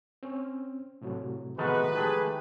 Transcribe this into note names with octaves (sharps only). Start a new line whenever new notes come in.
C4 C#4
A2 C3 F#3
D#3 F3 G#3 A3 B3 F#4 B4
D#3 G#3 A3 G4 G#4 G#5 A5